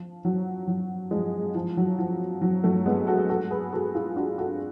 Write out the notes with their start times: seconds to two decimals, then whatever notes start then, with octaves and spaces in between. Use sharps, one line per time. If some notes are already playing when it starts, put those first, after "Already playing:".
Already playing: F3
0.25 F#3
0.67 F#3
1.11 F3 G#3
1.55 F3
1.77 F#3
1.99 F3
2.42 F#3
2.64 F#3 A3
2.86 G#3 B3
3.07 F#4 A4
3.29 F#4 A4
3.51 G#4 B4
3.72 F#4 A4
3.95 F4 G#4
4.16 D4 F#4
4.38 F#4 A4